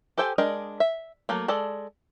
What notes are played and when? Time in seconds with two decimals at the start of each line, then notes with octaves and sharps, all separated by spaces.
0.18 G4 A4 C5 G5 G#5
0.38 G#3 D4 A#4 D#5 G5
0.80 E5
1.29 F#3 A3 A#3
1.48 G#3 A4 D5 A5